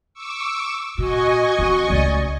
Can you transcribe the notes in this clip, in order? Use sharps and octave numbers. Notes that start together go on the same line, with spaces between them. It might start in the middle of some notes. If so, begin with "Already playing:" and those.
C#6 D6 E6
A#2 F#4 D#5 G#5 C#6
E3 C4 F#4
C#2 A3 D5